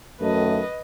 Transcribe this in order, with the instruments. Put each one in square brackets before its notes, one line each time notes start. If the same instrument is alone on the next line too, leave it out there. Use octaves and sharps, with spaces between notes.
[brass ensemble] F#2 D#3 A3 [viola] B4 D#5